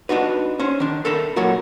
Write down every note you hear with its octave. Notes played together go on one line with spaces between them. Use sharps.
D4 D#4 F#4 B4
C#4 C5
D#3 D4
A4 A#4 E5 B5
A#2 F#3 A3 F#4 A#4